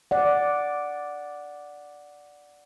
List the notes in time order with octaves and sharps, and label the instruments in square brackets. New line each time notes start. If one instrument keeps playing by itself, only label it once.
[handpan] D5 F#5